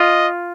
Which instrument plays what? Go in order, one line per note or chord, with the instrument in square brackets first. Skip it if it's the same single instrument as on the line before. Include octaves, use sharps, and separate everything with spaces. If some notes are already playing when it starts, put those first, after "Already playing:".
Already playing: [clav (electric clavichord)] F4 [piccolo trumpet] D#5